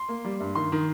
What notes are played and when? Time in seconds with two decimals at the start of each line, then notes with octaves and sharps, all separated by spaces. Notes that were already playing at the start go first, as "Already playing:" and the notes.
Already playing: C6
0.09 A#3
0.25 G3
0.40 G2
0.55 D#3 C6
0.72 D#3